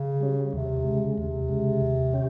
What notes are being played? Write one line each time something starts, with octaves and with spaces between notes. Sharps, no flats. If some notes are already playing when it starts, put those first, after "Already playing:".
Already playing: C#3
G3 C#4
D#2 C3
C#3 G#3
D#2 C3
C#3 G#3
D#2
C#4 G4